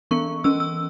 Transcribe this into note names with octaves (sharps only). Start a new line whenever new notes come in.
E3 B3 C#6
E3 C#4 E6
E6